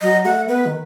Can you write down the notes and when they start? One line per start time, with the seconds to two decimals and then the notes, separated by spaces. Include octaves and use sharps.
0.01 F#3 D#5
0.25 A3 F#5
0.48 B3 B4
0.66 D#3